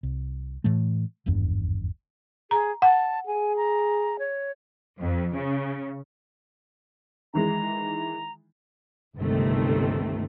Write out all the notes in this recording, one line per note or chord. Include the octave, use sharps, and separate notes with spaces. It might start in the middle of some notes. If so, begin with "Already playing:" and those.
C2
A2 E3 A3
D#1 G#1 E2 G2
G#4 A#5
F#5 A5
G#4 G#5
A#5
C#5
F2
C#3
D#3 E3 G#3 A#5
G1 C#2 C3 D#3 A3